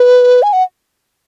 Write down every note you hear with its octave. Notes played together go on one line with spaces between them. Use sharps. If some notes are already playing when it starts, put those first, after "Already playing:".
Already playing: B4
G#5
F#5